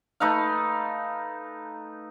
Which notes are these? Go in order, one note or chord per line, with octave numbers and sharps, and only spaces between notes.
A3 D#4 B4 F5